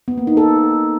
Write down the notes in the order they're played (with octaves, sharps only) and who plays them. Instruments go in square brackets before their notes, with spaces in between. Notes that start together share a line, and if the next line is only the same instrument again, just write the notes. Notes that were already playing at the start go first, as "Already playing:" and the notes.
[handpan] B3
A#3
D#4
A4